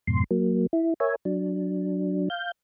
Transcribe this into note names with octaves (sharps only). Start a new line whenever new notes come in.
F2 G#2 B2 C6
F#3 A#3
E4
A#4 C#5 E5 G#5
F#3 D4
F5 G6